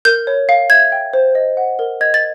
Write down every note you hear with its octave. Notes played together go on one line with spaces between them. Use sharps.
A#4 G6
C#5
F5
E5 G#6
G5
C5
D#5
F#5
A#4
D#5 G#6
A6